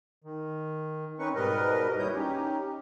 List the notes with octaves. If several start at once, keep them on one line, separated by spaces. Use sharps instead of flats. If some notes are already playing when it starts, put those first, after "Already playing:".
D#3
C4 C#4 D#4 B4 C#6
G#2 B2 G3 A#4 B4 D#5
D#2 G3 E4 C#5 D#6 G6
C#4 D#4 G4